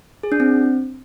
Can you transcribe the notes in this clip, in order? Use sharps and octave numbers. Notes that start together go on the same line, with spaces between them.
G#4
D4
C4